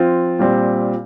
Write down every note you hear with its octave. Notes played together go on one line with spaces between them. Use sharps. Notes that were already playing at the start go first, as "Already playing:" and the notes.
Already playing: F3 C4 F4
A#2 G3 C4